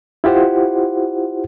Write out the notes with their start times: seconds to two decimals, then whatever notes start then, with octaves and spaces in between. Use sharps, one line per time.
0.24 E4 F4 G4 C5 F#5